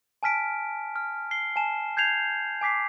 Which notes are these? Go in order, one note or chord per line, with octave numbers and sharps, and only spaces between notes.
G#5 A5 F6 B6 D7
F6
C7 G7
G#5 A5 E7
G6 G#6 C7 F7
G#5 D6 B6 C7